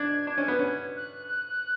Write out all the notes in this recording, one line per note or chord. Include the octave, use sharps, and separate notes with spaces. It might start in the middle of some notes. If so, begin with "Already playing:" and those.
Already playing: D4 G#6
D4
C#4
B3
C#4
F#6